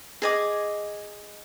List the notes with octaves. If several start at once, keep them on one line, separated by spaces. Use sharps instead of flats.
G#4 D#5 G#5 D6